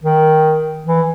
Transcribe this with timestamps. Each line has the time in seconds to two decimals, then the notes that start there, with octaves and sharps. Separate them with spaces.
0.04 D#3
0.87 E3